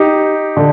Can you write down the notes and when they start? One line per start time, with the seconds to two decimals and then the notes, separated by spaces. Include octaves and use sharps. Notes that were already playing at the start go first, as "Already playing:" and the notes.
Already playing: D#4 G4
0.57 D3